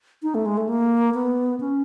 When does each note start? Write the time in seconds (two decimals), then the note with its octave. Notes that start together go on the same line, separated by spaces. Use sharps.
0.23 D#4
0.35 A3
0.46 G#3
0.57 A3
0.69 A#3
1.14 B3
1.60 C#4